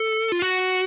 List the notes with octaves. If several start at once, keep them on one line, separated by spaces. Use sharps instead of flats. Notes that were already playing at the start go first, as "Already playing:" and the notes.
Already playing: A4
F4
F#4